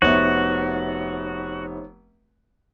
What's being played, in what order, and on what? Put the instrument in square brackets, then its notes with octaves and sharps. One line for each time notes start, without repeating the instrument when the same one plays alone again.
[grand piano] F1 B3 E5 [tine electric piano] D#4 C5 C#5 [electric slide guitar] F#4